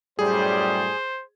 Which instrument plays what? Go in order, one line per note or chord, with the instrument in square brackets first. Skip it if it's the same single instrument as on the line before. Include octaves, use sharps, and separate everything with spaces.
[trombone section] F#2 A2 G3 [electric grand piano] G#4 [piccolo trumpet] C5